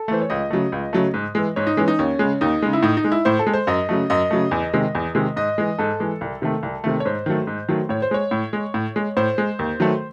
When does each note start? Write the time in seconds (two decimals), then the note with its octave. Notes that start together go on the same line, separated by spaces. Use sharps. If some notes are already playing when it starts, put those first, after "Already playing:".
Already playing: A4
0.08 E3 A3 C5
0.22 C#5
0.30 C#2 D#5
0.50 C#3 F#3 A3
0.72 C#2
0.93 C#3 F#3 A3
1.14 G#2
1.35 E3 G#3
1.56 G#2 C#5
1.67 D#4
1.77 E3 G#3 C#4
1.88 D#4
1.99 D#2 C#4
2.19 C#3 G#3
2.41 D#2 D#4
2.62 C#3 G#3
2.73 E4
2.83 A2 D#4
2.97 D#4
3.04 G#3
3.12 E4
3.25 A2 C5
3.39 A4
3.47 G#3
3.54 C5
3.67 F#2 D#5
3.89 C#3 F#3 A3
4.10 F#2 D#5
4.31 C#3 F#3 A3
4.51 E2
4.73 C3 D#3 G#3
4.95 E2
5.15 C3 D#3 G#3
5.36 G#2 D#5
5.58 E3 G#3
5.79 G#2 A4
6.00 E3 G#3
6.21 C2
6.42 C3 D#3 A3
6.63 C2
6.84 C3 D#3 A3
7.00 C#5
7.05 G#2 C5
7.26 D#3 F#3 A3
7.47 G#2
7.68 D#3 F#3 A3
7.89 A2 C#5
8.02 C5
8.11 G#3 C#5
8.31 A2
8.53 G#3
8.74 A2
8.96 G#3
9.17 A2 C5
9.38 G#3
9.59 D#2
9.80 D#3 F#3 A3